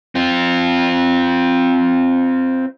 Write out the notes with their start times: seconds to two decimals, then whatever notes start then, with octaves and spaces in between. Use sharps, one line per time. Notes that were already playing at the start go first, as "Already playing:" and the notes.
0.15 C4 F4